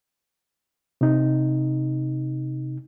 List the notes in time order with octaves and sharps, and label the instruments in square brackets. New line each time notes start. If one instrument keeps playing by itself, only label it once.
[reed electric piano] C3 D#4